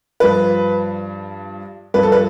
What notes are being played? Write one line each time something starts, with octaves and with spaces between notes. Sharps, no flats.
G2 F3 B4
G2 F3 B4
A4
B4